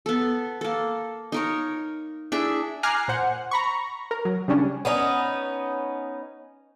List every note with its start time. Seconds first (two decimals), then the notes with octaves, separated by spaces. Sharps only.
0.06 B3 A4
0.61 A#3 A4
1.32 D#4 A#4 C#5
2.32 D4 E4 G#4 E5
2.83 G#5 A#5 D6 F6 F#6 C7
3.08 A#2 C5 F#5
3.51 A#5 B5 C#6
4.11 A#4
4.25 F#3
4.48 C#3 G3 C#4 D4
4.85 B3 C#4 D#4